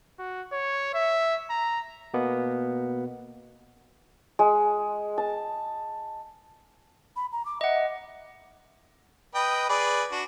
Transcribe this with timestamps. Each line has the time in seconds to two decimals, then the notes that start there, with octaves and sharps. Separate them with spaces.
0.19 F#4
0.52 C#5
0.95 E5
1.50 A#5
2.14 B2 A#3 B3
4.39 G#3
5.18 A5
7.16 B5
7.32 A#5
7.45 D6
7.61 D#5 E5 F#5
9.35 B4 D#5 G5
9.69 G#4 B4 D5
10.12 D4 F#4